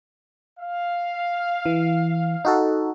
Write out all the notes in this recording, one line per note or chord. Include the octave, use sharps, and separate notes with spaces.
F5
E3
D#4 F#4 A4